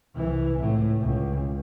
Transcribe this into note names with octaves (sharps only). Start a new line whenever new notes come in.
C2 E3
C#2 A2
C#2